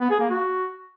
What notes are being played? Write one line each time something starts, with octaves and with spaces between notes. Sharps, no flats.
B3
G#4
A#3
F#4